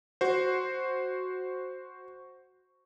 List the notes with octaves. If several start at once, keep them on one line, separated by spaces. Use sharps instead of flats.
F#4 C5